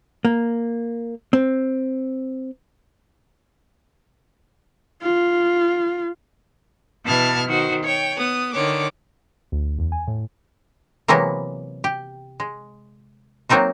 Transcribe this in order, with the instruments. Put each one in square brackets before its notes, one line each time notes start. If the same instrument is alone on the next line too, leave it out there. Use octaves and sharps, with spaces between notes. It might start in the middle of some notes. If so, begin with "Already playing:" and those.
[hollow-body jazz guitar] A#3
C4
[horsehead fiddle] F4
[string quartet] B2 E3 A5 F6 G#6
D#3 F#4 C5
C#5 G5
B3 D#6
D3 D#3 C#5 D6
[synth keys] D2
E2
G#5
A2
[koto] C3 E3 F#3 G#3 A#3 B3
G4
G#3
F#3 A#3 C4 D#4 F#4